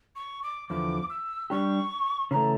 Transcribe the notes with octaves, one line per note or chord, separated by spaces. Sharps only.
C#6
D6
E2 D3 F3 D6
E6
G3 D4 G4 C#6
C#3 E3 A3 A#5